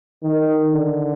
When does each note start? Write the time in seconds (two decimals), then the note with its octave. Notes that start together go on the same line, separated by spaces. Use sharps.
0.23 D#3
0.73 D3